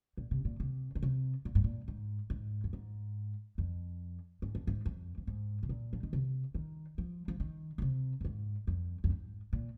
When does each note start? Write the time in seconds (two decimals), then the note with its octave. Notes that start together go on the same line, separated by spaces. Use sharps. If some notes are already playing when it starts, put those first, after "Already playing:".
0.17 A#2
0.31 C3
0.45 A#2
0.60 C3
0.95 D#3
1.03 C3
1.45 A#2
1.55 G#2
1.64 A#2
1.88 G#2
2.30 G#2
2.64 F2
2.73 G#2
3.58 F2
4.42 G#2
4.55 F2
4.67 G#2
4.86 F2
5.18 F2
5.27 G#2
5.63 C3
5.69 A#2
5.93 F3
6.03 D#3
6.13 C3
6.55 D#3
6.98 F3
7.28 F3
7.40 D#3
7.78 A#2
7.82 C3
8.21 F2
8.25 G#2
8.67 F2
9.04 F2
9.10 G#2
9.53 A#2